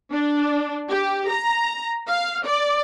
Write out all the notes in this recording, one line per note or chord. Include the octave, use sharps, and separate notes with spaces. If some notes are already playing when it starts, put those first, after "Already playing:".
D4
G4
A#5
F5
D5